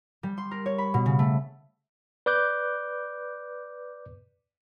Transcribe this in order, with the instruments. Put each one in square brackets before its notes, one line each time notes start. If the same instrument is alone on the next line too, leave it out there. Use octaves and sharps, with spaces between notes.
[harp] G3
C6
A#4
C#5
B5
B2
C#3
A3
[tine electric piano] B4 D5 D6 F#6 G6